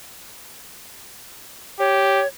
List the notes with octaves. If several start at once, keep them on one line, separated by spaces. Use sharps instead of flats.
G4 C#5